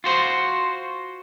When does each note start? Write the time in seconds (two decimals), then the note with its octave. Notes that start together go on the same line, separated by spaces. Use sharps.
0.04 F4 F#4 C5